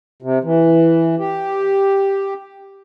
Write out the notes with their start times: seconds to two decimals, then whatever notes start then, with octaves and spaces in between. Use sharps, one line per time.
0.22 C3
0.44 E3
1.19 G4